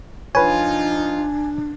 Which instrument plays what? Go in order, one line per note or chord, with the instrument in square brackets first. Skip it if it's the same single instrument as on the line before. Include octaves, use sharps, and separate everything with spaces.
[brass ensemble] F3 D#4 F4 [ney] D4 [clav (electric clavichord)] B4 C#5 [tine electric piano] G#5